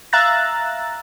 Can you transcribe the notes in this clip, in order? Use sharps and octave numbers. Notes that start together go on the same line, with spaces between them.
E5 F5 A#5 E6 F#6 A6